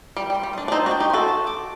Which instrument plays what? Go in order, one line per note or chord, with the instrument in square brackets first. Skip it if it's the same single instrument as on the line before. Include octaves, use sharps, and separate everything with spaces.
[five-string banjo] G3 [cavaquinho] G5
[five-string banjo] G3
[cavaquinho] C6
[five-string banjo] G3
[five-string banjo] D4 [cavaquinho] D#5
[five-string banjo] D4
[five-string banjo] C4 D#4 [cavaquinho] C5
[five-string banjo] D4 F#4
[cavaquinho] G5
[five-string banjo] D#4 G4
[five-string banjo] F#4 A4 [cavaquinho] C6
[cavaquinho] A5
D6